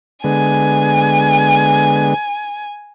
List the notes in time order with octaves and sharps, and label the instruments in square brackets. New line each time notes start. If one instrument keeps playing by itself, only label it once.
[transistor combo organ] D3 G#3 B3 [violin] G#5